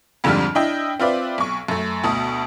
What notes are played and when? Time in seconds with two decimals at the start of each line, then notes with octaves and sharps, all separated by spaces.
0.24 F2 G#2 D3 F3 G3 F6
0.55 D4 E4 D#5 G5
0.99 C4 F4 B4 D5 E5
1.38 B1 C#6
1.68 F#2 A3
2.04 D2 B2 A5 D#6